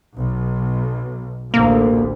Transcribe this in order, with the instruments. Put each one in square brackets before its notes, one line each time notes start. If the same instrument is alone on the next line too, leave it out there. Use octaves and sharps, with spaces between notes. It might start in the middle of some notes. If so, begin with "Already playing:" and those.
[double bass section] B1
[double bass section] A1 D2 [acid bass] A#3